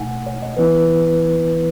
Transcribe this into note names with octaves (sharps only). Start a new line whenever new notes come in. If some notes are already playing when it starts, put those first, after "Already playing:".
Already playing: B2 A3 D#4 F#5 G#5
C#5
D#5
E3 B3 E4 B4